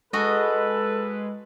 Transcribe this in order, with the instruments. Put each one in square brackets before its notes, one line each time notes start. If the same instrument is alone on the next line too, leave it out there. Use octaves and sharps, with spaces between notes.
[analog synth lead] G#3 [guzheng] F#4 D#5 [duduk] A4 [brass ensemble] B4